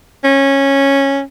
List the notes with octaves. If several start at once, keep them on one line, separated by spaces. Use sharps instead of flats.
C#4